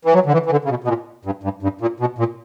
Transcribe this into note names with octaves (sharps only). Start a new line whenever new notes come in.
E3
F#3
D3
E3
E3
D3
C#3
B2
B2
A#2
G2
G2
G2
A#2
B2
A#2